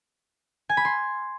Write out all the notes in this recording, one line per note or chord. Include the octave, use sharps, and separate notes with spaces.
G#5
B5
C6